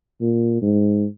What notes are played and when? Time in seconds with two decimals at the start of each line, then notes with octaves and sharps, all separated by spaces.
0.21 A#2
0.62 G#2